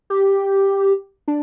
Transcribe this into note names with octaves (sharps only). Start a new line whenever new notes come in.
G4
D4